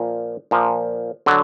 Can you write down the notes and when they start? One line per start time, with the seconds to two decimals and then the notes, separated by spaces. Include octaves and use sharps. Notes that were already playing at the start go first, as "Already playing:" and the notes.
Already playing: A#2 F3
0.51 A#2 F3
1.26 D3 F#3